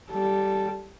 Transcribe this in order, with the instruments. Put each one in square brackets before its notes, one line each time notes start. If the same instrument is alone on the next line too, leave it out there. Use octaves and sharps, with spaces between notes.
[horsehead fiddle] G3 A4